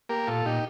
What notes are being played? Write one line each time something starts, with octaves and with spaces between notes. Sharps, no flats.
A#3 G4 A#4
A#2 F4 A4
A#2 D#4 G4